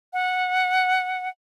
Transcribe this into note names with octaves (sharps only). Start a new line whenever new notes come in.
F#5